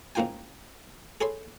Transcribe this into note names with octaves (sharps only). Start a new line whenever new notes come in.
G#2 C#3 A#3 F4 G5 G#5
G#4 A4 C#5 B5 C6